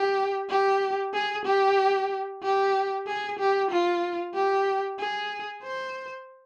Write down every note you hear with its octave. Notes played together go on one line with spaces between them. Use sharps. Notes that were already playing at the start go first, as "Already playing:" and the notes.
Already playing: G4
G4
G#4
G4
G4
G#4
G4
F4
G4
G#4
C5